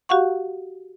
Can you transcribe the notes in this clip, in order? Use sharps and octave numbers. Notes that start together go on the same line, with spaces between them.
F#4 G4 F5 F#5 C#6